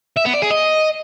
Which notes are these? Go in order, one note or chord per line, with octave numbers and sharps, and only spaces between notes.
E5
B3
D5
G#4
D#5